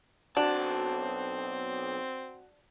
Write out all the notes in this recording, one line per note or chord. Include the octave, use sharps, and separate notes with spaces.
B1 C4 D4 F#4 A5